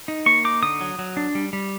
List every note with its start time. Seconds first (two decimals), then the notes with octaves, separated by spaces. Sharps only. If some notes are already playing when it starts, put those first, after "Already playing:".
0.08 D#4
0.26 A#3 C#6
0.45 D#4 D6
0.63 D3 D#6
0.81 F#3
0.99 F#3
1.17 D4
1.35 G3
1.53 G3